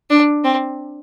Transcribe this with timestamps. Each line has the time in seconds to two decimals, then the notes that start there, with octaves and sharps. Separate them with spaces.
0.10 D4
0.44 C4